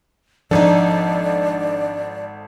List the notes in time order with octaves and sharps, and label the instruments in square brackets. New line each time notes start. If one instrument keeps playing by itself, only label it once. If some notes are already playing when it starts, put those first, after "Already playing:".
[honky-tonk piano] G#1 A4 [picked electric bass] F3 [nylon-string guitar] D4 D#4 [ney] D5